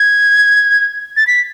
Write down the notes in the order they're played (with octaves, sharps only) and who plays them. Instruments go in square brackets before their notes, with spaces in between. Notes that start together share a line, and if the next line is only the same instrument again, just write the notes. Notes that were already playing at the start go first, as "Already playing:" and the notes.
Already playing: [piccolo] G#6
A6
B6